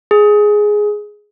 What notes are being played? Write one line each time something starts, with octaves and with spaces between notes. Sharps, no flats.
G#4